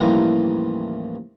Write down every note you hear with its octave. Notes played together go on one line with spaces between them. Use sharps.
A1 D#2 E3 F3 G3 A#5